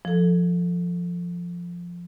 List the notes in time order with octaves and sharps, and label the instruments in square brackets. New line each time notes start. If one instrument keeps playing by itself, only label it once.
[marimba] F3 A4